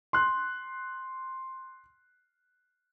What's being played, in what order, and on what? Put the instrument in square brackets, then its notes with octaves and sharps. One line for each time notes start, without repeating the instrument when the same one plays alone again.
[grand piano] C6 F#6